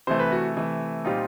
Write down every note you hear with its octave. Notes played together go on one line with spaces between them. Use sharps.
C3 E3 A3 C5
B4
F#4
C3 E3 A3
A#2 G3 C4 D#4 F4